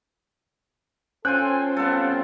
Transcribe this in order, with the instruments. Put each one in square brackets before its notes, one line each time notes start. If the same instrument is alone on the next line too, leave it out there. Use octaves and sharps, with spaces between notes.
[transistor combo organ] C#4 C5 [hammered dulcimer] F4 G5 [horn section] A4 G#5 [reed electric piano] F#6
[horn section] G3 C4 F5 [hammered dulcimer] B3 A4